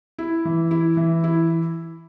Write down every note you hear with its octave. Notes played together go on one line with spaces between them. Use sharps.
E4
E3
E4
E3
E4